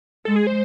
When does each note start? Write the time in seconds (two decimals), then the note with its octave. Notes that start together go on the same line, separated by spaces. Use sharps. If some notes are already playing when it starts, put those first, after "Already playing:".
0.25 G#3 A4
0.36 G#4
0.47 C5